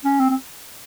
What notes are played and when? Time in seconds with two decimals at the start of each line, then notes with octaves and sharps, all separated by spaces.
0.04 C#4
0.20 C4
0.30 C4